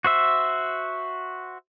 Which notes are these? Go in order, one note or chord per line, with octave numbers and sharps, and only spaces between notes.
F#4 C5 E5